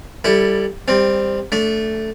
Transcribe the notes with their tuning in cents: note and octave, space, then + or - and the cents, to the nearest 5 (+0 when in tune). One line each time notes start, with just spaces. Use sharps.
G3 +0 E4 +0 A4 +15
G3 +20 C4 +0
A3 +0 D4 -20